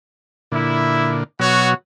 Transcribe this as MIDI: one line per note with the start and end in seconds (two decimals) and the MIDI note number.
0.52 1.24 46
0.52 1.24 50
0.52 1.19 64
1.40 1.74 47
1.40 1.74 54
1.40 1.71 66
1.40 1.71 73